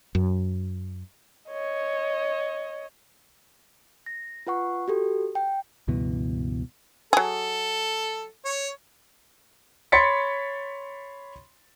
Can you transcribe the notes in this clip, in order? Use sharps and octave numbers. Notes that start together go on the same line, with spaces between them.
F#2
C#5 D#5
A#6
F4 B4 F#5 C#6
F#4 G4 A4
G5
C#2 G2 B2 E3
F#3 G#4 A4
C#5
C#5 B5 C6 A6 B6 C#7